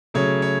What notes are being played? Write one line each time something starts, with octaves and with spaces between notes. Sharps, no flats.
C#3 F#3 A3 C#5
C#5